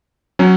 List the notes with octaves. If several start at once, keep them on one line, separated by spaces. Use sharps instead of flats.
F#3 C#4